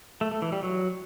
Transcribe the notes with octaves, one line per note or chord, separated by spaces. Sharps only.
A3
A3
E3
G3
F#3